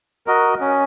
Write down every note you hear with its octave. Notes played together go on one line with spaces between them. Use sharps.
F#4 A#4 D#5
C#4